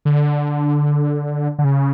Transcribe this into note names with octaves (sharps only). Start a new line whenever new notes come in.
D3
D3
C#3